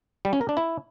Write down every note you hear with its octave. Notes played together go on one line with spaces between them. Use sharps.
G3
C#4
A#4
D4
E4